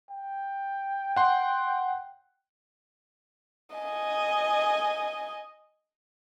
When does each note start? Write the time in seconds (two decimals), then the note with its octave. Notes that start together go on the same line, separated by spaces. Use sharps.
0.10 G5
1.16 F#5 C6
3.76 D#5 G#5